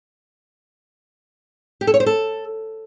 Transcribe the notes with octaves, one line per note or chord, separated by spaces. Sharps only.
G4
A4
C#5
C5
A4